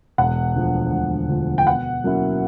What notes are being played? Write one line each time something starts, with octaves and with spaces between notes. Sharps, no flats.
E1 F#5
D2 D3 F3
E1
D2 D3 F3
G5
B2 F#5
F#3 A#3 C#4 E4